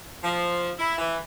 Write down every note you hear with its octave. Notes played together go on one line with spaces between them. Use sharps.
F3
E4
E3